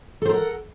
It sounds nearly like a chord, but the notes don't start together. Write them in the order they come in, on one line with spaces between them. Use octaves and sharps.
A4 C5 A#4 F#5